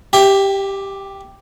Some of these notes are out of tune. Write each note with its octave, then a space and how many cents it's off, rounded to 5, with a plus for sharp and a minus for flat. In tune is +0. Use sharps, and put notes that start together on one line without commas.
G4 +0 E5 +0 G5 +45